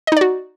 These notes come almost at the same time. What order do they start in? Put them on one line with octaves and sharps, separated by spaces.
D#5 D#4 D5 F#4